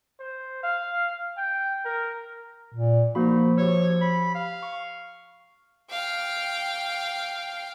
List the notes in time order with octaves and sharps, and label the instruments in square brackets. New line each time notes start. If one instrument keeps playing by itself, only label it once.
[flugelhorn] C5
F5
G5
A#4
[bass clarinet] A#2
[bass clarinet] F3 [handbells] A#3 F#4 B5 [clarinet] D#4
[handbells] G4 E6 [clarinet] C#5
[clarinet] B5
F5
[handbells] C#6
[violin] F5 G5